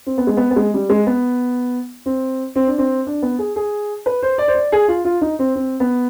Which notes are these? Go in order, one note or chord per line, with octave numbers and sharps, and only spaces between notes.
C4
B3
G#3
B3
B3
G#3
G3
G#3
B3
C4
C4
D4
C4
D4
B3
G#4
G#4
B4
C5
D5
C5
D5
G#4
F4
F4
D#4
C4
C4
B3